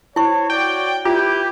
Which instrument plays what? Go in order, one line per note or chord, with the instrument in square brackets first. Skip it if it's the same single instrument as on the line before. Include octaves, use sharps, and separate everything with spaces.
[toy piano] E4 C#6 [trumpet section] C5 C#5
[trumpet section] F#4 C#5 D5 [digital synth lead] G5
[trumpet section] E4 B4 G5 [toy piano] F4 [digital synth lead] G4